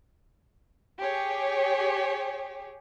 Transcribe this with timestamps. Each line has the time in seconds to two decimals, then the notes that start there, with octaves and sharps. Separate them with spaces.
0.99 G4 G#4 C#5